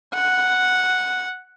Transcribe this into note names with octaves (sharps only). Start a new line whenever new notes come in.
F#5